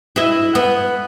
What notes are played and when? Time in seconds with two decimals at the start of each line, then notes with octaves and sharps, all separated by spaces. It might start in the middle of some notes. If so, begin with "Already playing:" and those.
0.16 E4 D#5 E5
0.55 B3